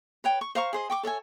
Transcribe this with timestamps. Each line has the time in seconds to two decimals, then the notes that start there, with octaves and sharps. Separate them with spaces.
0.24 B4 C#5 G5
0.41 C#6
0.55 C5 F5 A#5 C#6
0.73 G#4 C5 D#5
0.90 G5 C#6 D6
1.03 A4 C#5 E5 G#5